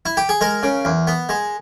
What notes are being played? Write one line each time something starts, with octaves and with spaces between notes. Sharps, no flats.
E4
G4
G#4
G#3 A#4
C#3
E2
B3
G#3